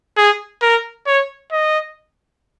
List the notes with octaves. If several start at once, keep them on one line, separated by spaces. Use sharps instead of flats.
G#4
A#4
C#5
D#5